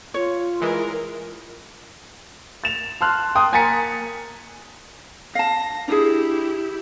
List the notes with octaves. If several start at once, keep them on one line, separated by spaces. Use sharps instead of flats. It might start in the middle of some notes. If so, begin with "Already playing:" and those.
F4 C#5
E3 G#3 A#4
A6 E7 F7
A5 C6 F6 F#6
G5 A5 C6 D#6
A#3 G#5 A#5 A6 B6 C#7
F5 A5 A#6
D4 E4 G4 G#4